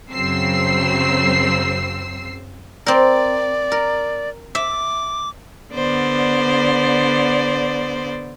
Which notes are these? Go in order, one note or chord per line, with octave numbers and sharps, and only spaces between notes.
F#2 C#3 F#3 C4 E6 C7
C4 A#4 D5
A#4
E5 D6
D3 B3 C5 D5